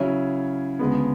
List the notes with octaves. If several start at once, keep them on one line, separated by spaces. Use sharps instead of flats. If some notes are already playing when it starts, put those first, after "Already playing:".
Already playing: C#3 F#3 C#4 E4
D2 C#3 G#3 B3